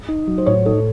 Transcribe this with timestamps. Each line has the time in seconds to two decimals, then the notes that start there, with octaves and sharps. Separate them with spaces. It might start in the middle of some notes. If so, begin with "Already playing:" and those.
0.08 D#4
0.28 F#3
0.38 C5
0.46 A2 C#5
0.66 D#4 A4